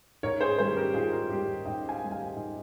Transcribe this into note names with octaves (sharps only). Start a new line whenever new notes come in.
G#2 A#4 C#5
G#4 C5
D#3 G3 G#4 C5
G4 A#4
G#2 F4 G#4
G4 A#4
D#3 G3 G4 A#4
G#2 D#5 G5
F5 G#5
D#3 G3
F5 G#5
G#2